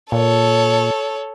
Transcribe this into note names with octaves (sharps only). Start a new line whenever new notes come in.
A#2 A4 C#5